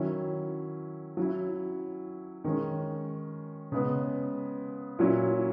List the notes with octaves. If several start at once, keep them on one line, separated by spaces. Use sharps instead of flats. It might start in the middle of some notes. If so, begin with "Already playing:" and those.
Already playing: D#3 F#3 C#4 E4
F#3 C#4 E4
D#3 G#3 C#4
C#3 G#3 B3
A#2 F#3 C#4 E4